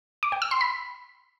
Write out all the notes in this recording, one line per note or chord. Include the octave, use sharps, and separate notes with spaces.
D6
G5
E6
C6
B5